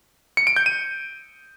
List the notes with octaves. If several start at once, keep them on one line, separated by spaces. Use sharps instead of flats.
C#7
D7
G6
D#7